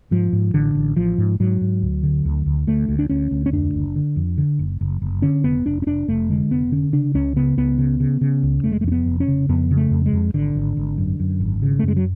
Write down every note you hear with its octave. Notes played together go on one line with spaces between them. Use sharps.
G#2 F3
G#2
A1 D3
A1
A1 F3
G#2
G#2 F#3
G#2
D2
D3
D2
D2
D2 A3
D2
D4
D2 C#4
D2
C#4
F2 D4
F#1
D3
F2
D3
F#1
F#1
F#1
D3 C#4
F1 B3
F1 D4
C#4
F1 D4
F1 A3
D3 G#3
F1 B3
D3 C#4
C#3 D4
C#2 C#4
C#3 B3
C#2 B3
C#3
C#3
C#3
C#2
F1 A3
G#3
A3
F2 C#4
B3
F1
C#4
C#3
F2 B3
C#3
A3
F2
G#3
F2
G#1 D3
G#1
G#1
F#2
F#2
G#1
C#3
A3
F#2
G#3
F#3